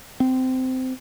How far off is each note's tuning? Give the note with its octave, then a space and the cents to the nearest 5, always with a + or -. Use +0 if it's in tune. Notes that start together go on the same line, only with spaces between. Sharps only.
C4 -20